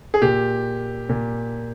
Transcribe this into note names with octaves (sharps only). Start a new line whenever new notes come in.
G#4
A#2 G4
A#2